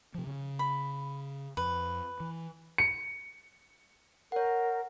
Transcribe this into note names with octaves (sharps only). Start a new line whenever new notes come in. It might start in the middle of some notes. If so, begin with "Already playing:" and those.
C3 F3
C#3
B5
F2 B4
E3
C#7
A#4 C#5 F#5